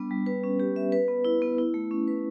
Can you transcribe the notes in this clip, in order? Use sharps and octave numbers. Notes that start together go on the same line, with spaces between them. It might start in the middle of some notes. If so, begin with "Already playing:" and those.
Already playing: G3 B3 D4
G3
B4
C#4
G4
E5
B4
B3
E4
B3
E4
A3
C#4
B4